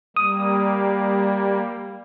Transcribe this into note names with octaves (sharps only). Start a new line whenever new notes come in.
G3 A#3 D#6